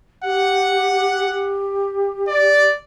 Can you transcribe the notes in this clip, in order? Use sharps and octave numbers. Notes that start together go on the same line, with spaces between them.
G4 F#5
G4
D5